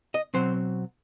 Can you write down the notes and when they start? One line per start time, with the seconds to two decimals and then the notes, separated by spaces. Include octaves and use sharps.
0.14 D#5
0.34 B2 F#3 C4 C5